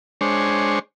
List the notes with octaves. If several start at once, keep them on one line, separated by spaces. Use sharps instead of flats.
G#3 D4 C5 C#5